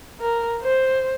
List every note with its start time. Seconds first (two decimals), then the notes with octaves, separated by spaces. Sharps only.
0.20 A#4
0.62 C5